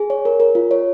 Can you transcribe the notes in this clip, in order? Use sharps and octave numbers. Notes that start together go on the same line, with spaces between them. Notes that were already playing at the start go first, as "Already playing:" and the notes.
Already playing: G#4
C#5
A#4
A#4
F4
C#5